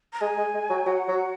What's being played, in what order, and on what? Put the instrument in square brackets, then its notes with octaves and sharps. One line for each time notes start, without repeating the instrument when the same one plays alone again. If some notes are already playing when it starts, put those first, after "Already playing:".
[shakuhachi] A#5
[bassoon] G#3 [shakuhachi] G#5
[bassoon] G#3
G#3
F#3
[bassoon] F#3 [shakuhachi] F#5
[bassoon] F#3